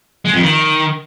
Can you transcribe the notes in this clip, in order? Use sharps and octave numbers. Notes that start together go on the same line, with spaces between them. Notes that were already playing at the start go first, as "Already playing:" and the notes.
G#3
F2
D#3